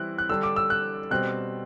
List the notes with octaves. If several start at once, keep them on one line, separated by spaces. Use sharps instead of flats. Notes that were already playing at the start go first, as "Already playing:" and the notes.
Already playing: E3 G3 C4 E4 F#6
F#6
D3 G3 D4 E6
D6
E6
F#6
B2 G3 C4 F#6